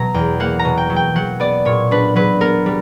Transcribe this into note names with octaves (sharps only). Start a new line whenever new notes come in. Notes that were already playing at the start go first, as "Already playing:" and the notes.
Already playing: B2 F#3 A#5
E2 G5
A#3 F#5
A#5
B2
G5
F#3
G5
F#3 F#5
B3 D5
A#2 C#5
D4 B4
F#3 B4
B3 A#4
G3